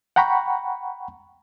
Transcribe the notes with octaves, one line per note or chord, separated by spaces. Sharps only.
F#5 G5 A#5 B5 C#6